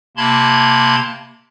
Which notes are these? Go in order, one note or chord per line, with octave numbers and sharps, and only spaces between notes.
C3 A#3 A5 B5 C6 G#6